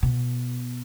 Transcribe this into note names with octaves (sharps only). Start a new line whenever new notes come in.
B2